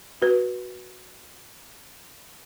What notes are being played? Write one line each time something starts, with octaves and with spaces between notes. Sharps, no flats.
F#4 B4